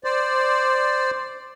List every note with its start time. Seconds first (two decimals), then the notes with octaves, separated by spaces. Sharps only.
0.04 C5 D5